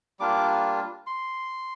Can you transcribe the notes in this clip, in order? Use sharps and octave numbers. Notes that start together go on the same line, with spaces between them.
G3 A#3 D4 F4 D6
C6